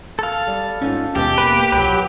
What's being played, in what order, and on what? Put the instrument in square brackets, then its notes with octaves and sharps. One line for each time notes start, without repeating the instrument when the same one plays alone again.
[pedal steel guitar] A4 F5
[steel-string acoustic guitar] G3
[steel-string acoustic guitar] G#2 D#4 F4 [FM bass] C#4
[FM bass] D#2 [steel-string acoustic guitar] B2 G#3 E5 [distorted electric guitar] G4
[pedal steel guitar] A#3 B4
[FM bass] C2 [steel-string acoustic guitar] B2 F3 [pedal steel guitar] F#3 B4